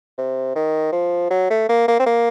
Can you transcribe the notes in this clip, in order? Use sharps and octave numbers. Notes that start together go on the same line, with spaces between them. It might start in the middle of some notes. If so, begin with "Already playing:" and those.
C3
D#3
F3
F#3
A3
A#3
A#3
C4
A#3